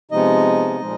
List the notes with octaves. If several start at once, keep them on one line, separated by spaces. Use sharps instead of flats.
C3 F3 G#3 B3 D#4 D#5
A#2 F3 G#3